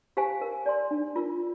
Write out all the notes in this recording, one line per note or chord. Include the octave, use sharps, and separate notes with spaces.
G4 C5 F5 G#5
A#4
D5 G#5 C6
D4
F4 A#4